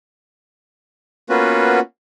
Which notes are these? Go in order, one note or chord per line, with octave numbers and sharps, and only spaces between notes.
A#3 B3 C#4 F4 F#4 B4